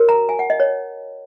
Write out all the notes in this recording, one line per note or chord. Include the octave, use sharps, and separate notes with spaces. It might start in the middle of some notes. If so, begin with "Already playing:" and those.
Already playing: F#4 A#4 C#5
A#5
G#5
F#5
D#5
C#5